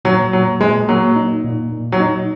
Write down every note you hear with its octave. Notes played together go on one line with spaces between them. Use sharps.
A#2 F#3
A#2 F#3
A#2 G#3
F#3 A#3
D#4
A#2
A#2
F#3
D#4